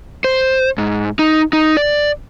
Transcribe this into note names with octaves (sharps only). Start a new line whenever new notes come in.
C5
G#2
D#4
D#4
D5